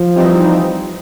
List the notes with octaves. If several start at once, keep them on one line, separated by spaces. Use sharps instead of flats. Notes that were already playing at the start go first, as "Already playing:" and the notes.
Already playing: F3
E3 G3 C4 D#4